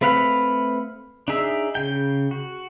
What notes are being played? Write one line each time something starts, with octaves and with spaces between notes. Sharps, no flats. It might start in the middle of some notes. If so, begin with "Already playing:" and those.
A3 C4 B4 F5 F#5
D4 D#4 G#4 E5
C#3 G5
F#4